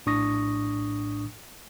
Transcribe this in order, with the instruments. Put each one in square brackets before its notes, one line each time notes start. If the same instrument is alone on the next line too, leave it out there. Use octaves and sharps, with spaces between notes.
[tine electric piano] A#1 A2 D4 C#6 D#6 A#6